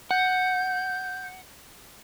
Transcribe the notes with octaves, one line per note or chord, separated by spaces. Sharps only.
F#5 G6